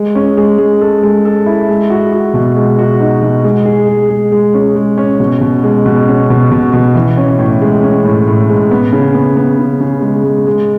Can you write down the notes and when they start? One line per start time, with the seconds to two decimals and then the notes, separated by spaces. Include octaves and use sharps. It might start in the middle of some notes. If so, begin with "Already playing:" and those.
Already playing: G#3
0.15 C#4
0.37 G#3
0.58 G#3
0.81 A4
1.03 G#3
1.25 A4
1.46 E4
1.69 G#3
1.90 F#4
2.12 F#4
2.34 B2
2.56 G#3
2.79 F#4
3.00 D#4
3.22 B2
3.44 G#3
3.66 G#4
3.89 G#3
4.10 G#3
4.32 G#3
4.54 C#4
4.76 G#3
4.98 C#4
5.20 B2
5.41 B2
5.64 G#3
5.86 B2
6.08 C#4
6.30 B2
6.52 B2
6.73 B2
6.95 E3
7.17 C#4
7.39 A2
7.61 G#3
7.83 C#4
8.04 A2
8.27 A2
8.50 G#3
8.71 B3
8.93 C#3
9.14 B3
9.37 B3
9.58 C#3
9.81 C#3
10.02 G#3
10.24 G#3
10.47 G#3